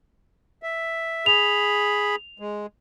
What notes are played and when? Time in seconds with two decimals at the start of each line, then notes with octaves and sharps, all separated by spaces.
0.63 E5
1.26 G#4 B5 F7
2.40 G#3